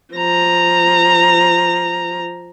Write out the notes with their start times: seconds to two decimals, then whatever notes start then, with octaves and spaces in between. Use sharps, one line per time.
0.14 F3 A#5